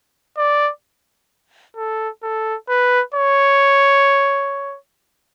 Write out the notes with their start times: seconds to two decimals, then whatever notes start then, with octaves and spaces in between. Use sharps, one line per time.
0.38 D5
1.77 A4
2.23 A4
2.69 B4
3.14 C#5